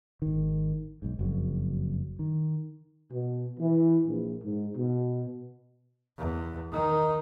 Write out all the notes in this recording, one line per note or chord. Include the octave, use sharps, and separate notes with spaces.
G#1 D#3
B1 G#2
F#1 F2 F#3
D#3
B2
E3
A#1
G#2
B2
E2
D#3 D#4